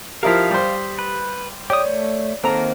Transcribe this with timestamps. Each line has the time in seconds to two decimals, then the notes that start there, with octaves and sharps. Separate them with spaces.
0.23 F3 E4 G4 A#4 F5 D#6 B6
0.51 G3 C5
0.99 B4
1.70 G4 C#5 D5 D#6
1.85 A3
2.44 D#3 A#3 C4 A4 C5 A#5